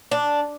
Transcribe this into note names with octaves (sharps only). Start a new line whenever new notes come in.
D4